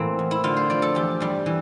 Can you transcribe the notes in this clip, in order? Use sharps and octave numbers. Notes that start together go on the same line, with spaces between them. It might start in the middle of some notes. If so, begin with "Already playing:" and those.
Already playing: A2 E3 A#3 C4
E2
E4
D3 F4
C5
F3 D5
A4
E2 G4
G2 G3
E3